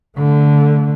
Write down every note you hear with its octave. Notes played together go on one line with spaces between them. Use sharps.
D3 A3